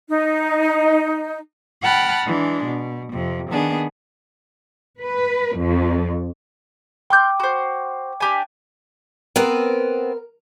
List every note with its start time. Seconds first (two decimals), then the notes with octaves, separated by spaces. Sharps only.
0.09 D#4
1.82 F#5 G5 A5 B5 F6 F#6
2.25 E3 G#3 D4
2.65 B2
3.12 F2 C3
3.50 D#3 B3 D4 G#4
5.00 B4
5.59 F2
7.10 G5 C6 D6 F6 G6
7.40 F#4 C5
8.20 D4 G4 G#5
9.36 B3 C4 A#4 B4